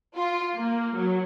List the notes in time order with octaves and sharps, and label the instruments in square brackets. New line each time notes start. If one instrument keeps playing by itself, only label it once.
[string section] F4
A#3
F#3